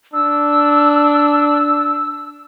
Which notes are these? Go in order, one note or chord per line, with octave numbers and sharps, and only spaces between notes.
D4 E6